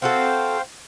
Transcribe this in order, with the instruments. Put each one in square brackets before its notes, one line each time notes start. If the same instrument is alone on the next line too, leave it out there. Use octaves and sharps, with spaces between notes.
[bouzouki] C4 F#4 A4 [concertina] C5 F5 G5